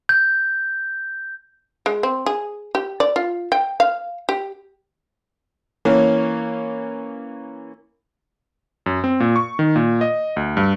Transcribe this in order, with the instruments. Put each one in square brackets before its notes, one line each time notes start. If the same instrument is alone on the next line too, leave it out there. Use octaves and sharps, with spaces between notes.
[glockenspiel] G6
[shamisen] G#3
C4
G#4
G4
D5
F4
G5
F5
G4
[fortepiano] E3 A#3 C#4
[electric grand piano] F#2
C4
A#2
C#6
D#3
A#2
D#5
D2
G2